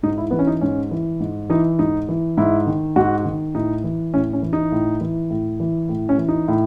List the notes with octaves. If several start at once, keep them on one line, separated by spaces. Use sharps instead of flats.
G#2 D#4
E4
E3 B3
C#4
D#4
G#2 C#4
E3
G#2
E3 D#4
G#2 D#4
E3
G#2 E4
D#3
G#2 F#4
D#3
A2 D#4
E3
A2 C#4
C#4
E3
D#4
A2
E3
A2
E3
A2
C#4
E3
D#4
A2